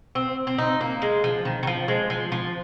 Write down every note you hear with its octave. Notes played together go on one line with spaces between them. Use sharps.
C4
C4
D#4
A#3
G#3
F3
D#3
D#3
F3
G#3
F3
F3